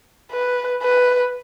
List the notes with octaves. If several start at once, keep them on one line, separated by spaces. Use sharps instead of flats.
B4
B4